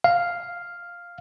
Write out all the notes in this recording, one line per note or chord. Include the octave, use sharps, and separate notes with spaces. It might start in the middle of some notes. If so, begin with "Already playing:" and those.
F5